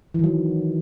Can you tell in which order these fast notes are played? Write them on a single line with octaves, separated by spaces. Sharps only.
E3 D#3 F#3